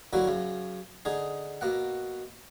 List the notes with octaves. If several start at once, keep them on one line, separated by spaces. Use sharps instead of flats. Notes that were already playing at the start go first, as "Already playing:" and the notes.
D3 F#3 A#3 E4 F#4
F#2 C#3
D3 D#4 G#4
B2 A#3 F#5